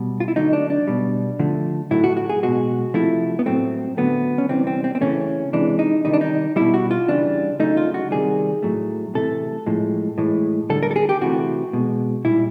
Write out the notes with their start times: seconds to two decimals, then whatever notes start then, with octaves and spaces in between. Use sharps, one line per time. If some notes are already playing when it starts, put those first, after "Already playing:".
Already playing: B2 G3
0.20 F4
0.28 E4
0.36 D3 F#3 A3 D#4
0.53 D4
0.70 D4
0.87 B2 G3
1.39 D3 F3 A3
1.91 A2 F#3 A3 E4
2.04 F#4
2.17 F#4
2.29 G#4
2.43 B2 G#3 F#4
2.94 C3 F3 A3 E4
3.39 B3
3.46 A2 F#3 A3 C4
3.97 D3 F#3 A3 B3
4.38 C#4
4.49 C3 E3 G3 C4
4.67 C4
4.84 C4
4.95 C4
5.01 C#3 E3 A3 C#4
5.53 C3 E3 G#3 D4
5.79 D#4
6.05 C3 D#3 G3 D#4
6.13 D4
6.21 D#4
6.56 B2 G3 E4
6.74 F#4
6.91 F4
7.08 C#3 E3 G3 D4
7.60 C#3 F#3 A3 D#4
7.77 F4
7.94 F#4
8.11 C3 D#3 G3 G#4
8.63 A2 F#3 A3
9.15 C3 E3 A3 A4
9.66 A2 F3 G#3
10.18 A2 E3 G#3
10.70 D3 G3 A4
10.83 A#4
10.91 A4
10.96 G#4
11.09 G4
11.21 C3 E3 A3 F#4
11.73 B2 G#3
12.25 A#2 G3 E4